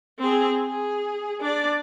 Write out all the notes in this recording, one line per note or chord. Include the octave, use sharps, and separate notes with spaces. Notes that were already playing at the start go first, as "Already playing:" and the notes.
C4 G#4
G#4
D4 D5